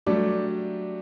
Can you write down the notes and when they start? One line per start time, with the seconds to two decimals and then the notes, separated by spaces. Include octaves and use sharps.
0.06 F#3 G3 A3 D4 G4